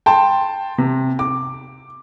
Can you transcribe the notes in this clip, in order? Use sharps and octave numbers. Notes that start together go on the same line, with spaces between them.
G5 A5 C6
C3
D6